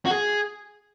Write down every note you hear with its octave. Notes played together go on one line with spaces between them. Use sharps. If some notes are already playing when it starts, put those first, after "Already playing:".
F#4
G#4